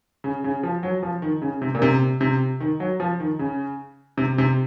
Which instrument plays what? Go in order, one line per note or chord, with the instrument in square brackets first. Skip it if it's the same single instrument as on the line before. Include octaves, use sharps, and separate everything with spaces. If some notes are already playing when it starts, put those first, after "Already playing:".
[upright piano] C#3
C#3
F3
F#3
F3
D#3
C#3
C3
A#2
C3
C3
D#3
F#3
F3
D#3
C#3
C3
C3